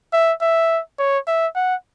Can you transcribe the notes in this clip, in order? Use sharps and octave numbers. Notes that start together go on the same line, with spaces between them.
E5
E5
C#5
E5
F#5